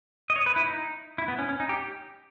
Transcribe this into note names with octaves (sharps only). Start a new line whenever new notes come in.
D#5
C#5
B4
E4
D#4
E4
B3
C#4
C#4
D#4
G4